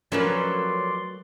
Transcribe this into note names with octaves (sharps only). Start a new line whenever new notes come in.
F3 F#3 A3 C#4 A#4 B4 D5 C6